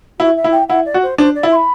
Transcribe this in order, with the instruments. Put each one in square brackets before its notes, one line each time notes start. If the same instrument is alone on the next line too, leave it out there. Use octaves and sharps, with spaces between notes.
[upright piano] E4 [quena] F#4
[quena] E5
[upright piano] E4
[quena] G5
[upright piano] E4 [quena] F#5
[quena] D5
[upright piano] F#4
[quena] C5
[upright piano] D4 [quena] C5
[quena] D5
[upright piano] E4
[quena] C6
B5